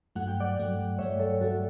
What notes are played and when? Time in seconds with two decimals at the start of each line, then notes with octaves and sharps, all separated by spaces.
0.15 G2 F#3 A3 F#5
0.28 G5
0.40 D5 F#5
0.58 G2 F#3 A3
0.99 G2 F#3 A3 C#5 E5
1.19 A4 C#5
1.41 G2 F#3 A3 F#4 A4